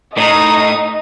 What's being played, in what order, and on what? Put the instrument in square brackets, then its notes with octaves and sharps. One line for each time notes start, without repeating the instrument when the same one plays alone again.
[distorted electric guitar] A2 [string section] D#4 [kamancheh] D#5 [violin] D#6